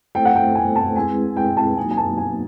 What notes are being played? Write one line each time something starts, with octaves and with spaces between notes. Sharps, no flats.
A3 C4 E4 A4 C5 G5
F#5
G5
G#5
A5
G#3 C4 E4 G#4 B4 G#5
G5
A5
F#3 A#3 D#4 F#4 G#5
G#5
A5
G#5